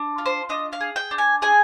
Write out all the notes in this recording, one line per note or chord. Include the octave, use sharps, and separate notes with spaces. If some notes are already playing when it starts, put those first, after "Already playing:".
Already playing: D4
F4
C5
D4 D#5
F5
G#4
G5
D4
G#5
G#4 G#5